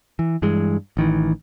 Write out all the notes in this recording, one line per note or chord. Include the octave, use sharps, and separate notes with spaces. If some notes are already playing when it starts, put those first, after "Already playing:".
E3
G2 E3 G#3
A1 D#3 E3